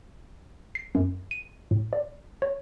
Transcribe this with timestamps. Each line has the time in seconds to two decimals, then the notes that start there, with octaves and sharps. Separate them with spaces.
0.75 C7
0.95 F#2
1.31 D#7
1.71 A2
1.93 D5
2.42 C#5